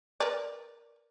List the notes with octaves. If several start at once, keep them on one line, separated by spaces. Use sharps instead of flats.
A#4 B4 D5